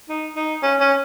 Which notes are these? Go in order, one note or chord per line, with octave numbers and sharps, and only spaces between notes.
D#4
D#4
C#4
C#4